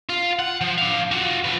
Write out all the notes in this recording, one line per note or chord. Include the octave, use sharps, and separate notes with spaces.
F4
F#5
F3
D4 F5
F4 F#4
F3 B4